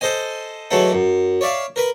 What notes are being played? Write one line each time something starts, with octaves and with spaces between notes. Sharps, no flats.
A4 C5 D#5 G#5
E3 F#3 G#3 A3 A4
F#2
C#5 D5 E5 F5
A#4 B4 B5